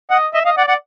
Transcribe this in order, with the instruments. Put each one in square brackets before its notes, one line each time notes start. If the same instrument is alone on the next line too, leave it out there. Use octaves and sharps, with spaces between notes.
[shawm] D#5 [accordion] F#5
[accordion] D#5 [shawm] E5
[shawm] D#5 [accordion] F5
[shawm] D5 [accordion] F#5
[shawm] D5 [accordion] F#5